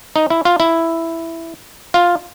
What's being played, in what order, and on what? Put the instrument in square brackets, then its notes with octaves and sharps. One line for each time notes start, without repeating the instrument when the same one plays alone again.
[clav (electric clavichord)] D#4
E4
F4
E4
F4